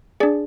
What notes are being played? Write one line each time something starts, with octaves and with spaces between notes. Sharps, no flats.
D4 G#4 D5